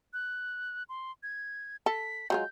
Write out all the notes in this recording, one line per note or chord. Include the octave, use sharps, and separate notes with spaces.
F#6
C6
G#6
A4 B6
F#3 G#3 F4 G6